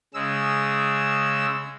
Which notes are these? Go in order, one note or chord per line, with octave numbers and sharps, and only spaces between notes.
C#3 G#3 E6